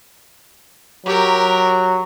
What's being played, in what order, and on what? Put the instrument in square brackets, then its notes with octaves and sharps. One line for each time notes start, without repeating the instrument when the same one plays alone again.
[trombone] F#3 [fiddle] G4 A#4